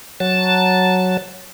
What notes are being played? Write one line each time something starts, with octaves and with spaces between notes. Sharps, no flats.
F#3 A5